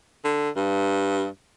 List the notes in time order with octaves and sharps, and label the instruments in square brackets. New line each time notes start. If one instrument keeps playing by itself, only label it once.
[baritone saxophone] D3
G2